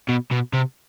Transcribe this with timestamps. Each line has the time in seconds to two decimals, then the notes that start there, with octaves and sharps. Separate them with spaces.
0.09 B2
0.32 B2
0.54 C3